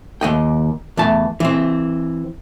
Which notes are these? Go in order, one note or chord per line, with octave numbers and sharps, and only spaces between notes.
D#2 D#5 G5
E2 A3 A5
E3 C4